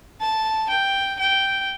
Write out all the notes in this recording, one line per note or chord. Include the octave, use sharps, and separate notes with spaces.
A5
G5
G5